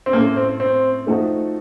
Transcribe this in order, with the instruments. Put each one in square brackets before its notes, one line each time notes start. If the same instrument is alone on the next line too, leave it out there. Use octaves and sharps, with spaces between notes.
[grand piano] C4
[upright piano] A2 A3 C#4 A4 [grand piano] A#3
[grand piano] C4
C4
[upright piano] F3 A3 D#4 F#4 A4